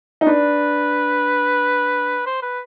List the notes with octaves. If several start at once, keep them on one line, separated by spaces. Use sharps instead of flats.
D#4
D4 B4
C5
B4